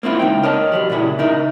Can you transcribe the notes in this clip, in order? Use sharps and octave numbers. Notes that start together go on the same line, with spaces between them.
A#3 C4 E4 F4
C#2 D#4 G5
A#4 C#5 D#5 A5
C2 F#3 G3
A#2 C#3 E4 G#4
C#3 D#4 A#4 E5